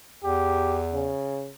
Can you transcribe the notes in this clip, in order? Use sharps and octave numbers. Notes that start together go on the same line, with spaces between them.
E2 G4
C#3